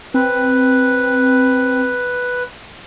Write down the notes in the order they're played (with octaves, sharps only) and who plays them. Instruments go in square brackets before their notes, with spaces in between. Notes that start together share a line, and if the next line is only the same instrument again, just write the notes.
[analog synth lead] C4 [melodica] B4